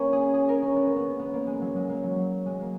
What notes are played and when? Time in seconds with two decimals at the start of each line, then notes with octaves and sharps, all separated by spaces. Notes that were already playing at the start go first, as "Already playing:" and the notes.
Already playing: A#3 C#4
0.13 G#4
0.34 G#4
0.49 A#4
0.62 C#4
0.76 B3
0.87 C#4
0.96 B3
1.19 B3
1.33 A#3
1.47 G#3
1.62 F#3
1.76 G#3
1.89 A#3
2.03 F#3
2.46 G#3
2.61 A#3